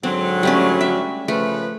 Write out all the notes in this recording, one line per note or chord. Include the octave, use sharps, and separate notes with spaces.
G#2 D3 F#3 C4
G3 A3 C#4
E5
C#3 F3 A3 B4